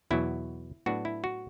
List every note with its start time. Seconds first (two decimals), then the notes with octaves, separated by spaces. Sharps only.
0.11 E2 B2 F#3 E4
0.86 A2 F#3 B3 D4 F#4
1.05 E4
1.24 F#4